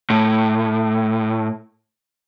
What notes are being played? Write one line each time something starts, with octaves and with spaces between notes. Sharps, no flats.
A2